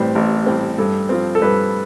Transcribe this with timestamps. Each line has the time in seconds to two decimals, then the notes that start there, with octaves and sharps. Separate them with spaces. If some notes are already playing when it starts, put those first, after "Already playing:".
Already playing: A1 A2 G3 C4 B4 C5 D5
0.15 A1
0.46 A2 G3 C4
0.78 G2 A4
1.09 F3 C4
1.35 A4
1.41 G2 B4